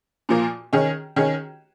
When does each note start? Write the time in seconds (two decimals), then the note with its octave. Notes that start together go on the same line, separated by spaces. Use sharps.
0.29 A#2 F3 A#3
0.73 D#3 C#4 G#4
1.16 D#3 C#4 G#4